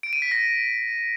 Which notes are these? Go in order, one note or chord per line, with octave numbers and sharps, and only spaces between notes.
D7
D#7
B6
A#6